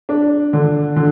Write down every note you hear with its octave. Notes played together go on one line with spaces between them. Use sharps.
D4
D3
D3